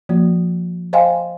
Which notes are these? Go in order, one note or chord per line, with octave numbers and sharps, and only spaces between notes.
F3 A#3 F#4
C5 D#5 F5 G5 G#5 C6